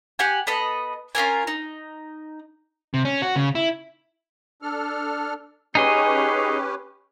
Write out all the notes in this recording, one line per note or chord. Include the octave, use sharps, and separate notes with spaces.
G4 F#5 G#5
B3 A4 D#5 B5
C#4 F4 A#4 G#5
D#4
C3
C#4
F#4
C#3
E4
D4 A4 F6
C#4 D#4 G4 G#4 B4 D#5